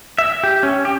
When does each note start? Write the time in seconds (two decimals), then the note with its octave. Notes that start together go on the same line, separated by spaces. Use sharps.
0.18 E5
0.43 G4
0.63 C#4
0.85 G4